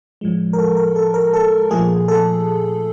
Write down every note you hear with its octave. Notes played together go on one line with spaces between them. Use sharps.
A2 F3 G#3
A#4
A4
A#4
A4
A#4
A4
A#2 F3 A3 G#4
A4